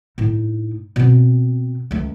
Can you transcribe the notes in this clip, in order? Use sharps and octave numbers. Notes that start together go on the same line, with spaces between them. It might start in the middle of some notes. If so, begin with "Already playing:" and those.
A2 D#4
B2 C4
C#2 A3